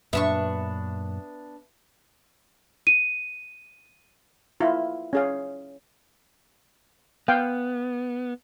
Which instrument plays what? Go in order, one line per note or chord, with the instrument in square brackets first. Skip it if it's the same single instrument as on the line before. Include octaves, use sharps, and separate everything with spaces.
[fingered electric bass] F#2 A#2 [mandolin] B3 D4 C#6 [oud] E5
[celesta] D#7
[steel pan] E4 F4
C#4 G#4 F5
[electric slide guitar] B3 [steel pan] F5 G5